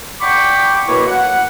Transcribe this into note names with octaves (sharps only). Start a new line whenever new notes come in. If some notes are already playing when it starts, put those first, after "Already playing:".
D5 F#5 G5 B5 C#6 D6
F#2 B2 A#3 E4 B4 C#6
F#5